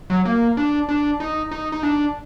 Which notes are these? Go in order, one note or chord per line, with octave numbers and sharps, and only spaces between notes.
F#3
A#3
D4
D4
D#4
D#4
D#4
D4